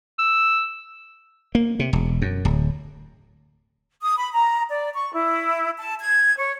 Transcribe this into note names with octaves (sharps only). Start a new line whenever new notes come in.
E6
A#3
C3
E1
F#2
D1
D#6
B5
A#5
D5
C#6
E4
A5
G#6
C#5